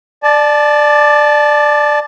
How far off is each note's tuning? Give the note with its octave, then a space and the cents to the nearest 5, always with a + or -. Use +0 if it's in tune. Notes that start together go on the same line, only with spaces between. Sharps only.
D5 +15 A5 -20